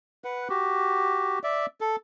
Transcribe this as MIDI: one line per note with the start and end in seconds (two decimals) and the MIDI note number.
0.24 0.48 71
0.24 0.48 78
0.49 1.39 66
0.49 1.39 67
1.43 1.66 74
1.43 1.66 76
1.81 1.96 69